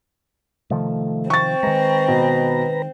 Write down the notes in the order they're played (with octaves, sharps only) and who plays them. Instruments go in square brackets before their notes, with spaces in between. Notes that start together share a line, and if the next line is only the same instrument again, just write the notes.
[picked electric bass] C3 D#3 F3 [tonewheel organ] A3
[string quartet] C4 [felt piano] C#6 A6
[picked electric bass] D#3 G#3 [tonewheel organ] B4 A#5
[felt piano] B2